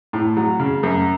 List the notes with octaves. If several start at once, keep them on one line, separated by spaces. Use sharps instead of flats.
A2
F#3
C#3
F#2